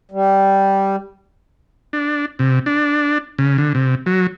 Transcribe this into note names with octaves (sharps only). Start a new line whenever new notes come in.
G3
D4
C3
D4
C#3
D3
C3
F#3